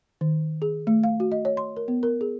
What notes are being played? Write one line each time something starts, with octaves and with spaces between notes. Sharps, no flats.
D#3
G#4
A3
F5
F#4
D#5
C#5
C6
A#4
B3
A#4
G#4